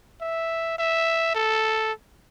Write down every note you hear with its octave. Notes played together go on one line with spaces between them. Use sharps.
E5
E5
A4